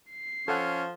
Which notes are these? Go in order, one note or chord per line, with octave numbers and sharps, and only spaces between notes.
C7
F3 C#4 A4 F#5